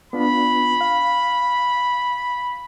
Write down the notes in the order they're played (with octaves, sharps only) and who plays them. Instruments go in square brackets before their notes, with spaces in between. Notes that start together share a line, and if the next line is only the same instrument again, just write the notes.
[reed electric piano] B3 D4 F4 [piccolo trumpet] B5
[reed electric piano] F5